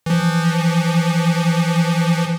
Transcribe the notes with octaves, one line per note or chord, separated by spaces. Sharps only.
E3 F3